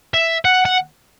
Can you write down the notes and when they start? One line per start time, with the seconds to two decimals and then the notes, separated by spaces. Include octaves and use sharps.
0.14 E5
0.45 F#5
0.65 F#5